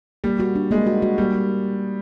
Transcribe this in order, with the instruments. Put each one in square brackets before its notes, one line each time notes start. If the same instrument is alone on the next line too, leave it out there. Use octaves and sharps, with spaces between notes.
[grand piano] G3 [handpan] A#3
[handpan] F#4
D4
[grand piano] G#3 [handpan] A#3
[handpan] F#4
F#4
[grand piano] G3 [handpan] A#3